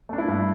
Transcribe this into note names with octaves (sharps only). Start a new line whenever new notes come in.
A3 D4
E4
G2